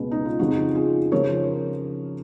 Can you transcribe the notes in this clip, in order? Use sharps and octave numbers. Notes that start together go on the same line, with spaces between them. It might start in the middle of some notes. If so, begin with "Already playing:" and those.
Already playing: C#2 B2 G#4 B4
D#4
F4
F2 C#3 F3 D#4 F#4
F4 G#4
C#3 F3 A#4 C#5